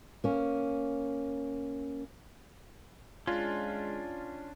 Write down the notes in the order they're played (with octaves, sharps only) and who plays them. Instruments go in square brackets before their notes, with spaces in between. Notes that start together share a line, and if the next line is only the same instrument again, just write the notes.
[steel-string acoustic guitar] A#3 C#4
[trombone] G#3 [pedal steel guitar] C#4 D4 [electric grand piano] F4